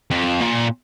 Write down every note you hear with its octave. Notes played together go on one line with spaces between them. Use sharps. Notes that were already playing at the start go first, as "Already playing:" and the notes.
F2
A#2